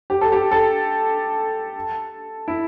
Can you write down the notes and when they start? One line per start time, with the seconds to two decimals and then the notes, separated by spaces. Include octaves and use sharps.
0.10 G4
0.21 A4
0.32 G4
0.51 A4
2.48 E4